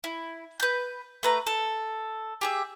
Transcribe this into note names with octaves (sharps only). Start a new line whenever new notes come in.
E4
B4 G6
A3 B4 A#5
A4
G4 G#4 E5